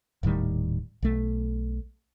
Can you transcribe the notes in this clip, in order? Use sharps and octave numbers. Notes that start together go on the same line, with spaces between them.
D#1 A2 D#3 G3
B1 A3